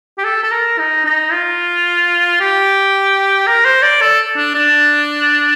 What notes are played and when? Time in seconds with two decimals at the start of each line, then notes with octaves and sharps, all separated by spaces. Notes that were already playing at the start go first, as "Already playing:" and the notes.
0.18 G4
0.24 A4
0.43 A4
0.51 A#4
0.79 D#4
1.05 D#4
1.33 F4
2.40 G4
3.47 A#4
3.65 C5
3.82 D5
4.02 A4
4.37 D4
4.55 D4